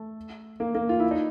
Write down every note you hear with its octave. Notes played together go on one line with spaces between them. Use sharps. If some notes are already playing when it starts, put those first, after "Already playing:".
Already playing: A3
A#3
A#3
F4
E4
D#4